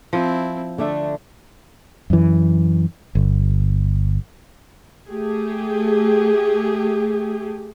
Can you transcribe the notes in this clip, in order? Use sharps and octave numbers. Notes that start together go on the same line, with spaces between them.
F3 C4 E4
D3 A3 D4 E5
F#2 E3
G1
A3 G4 G#4